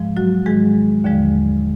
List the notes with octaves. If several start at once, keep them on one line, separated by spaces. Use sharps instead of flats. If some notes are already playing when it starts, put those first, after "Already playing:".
Already playing: G#2 F3 G#3
F#3 F#4
G#2 D#3 F#3 G#3 G#4
D#2 D3 F3 G#3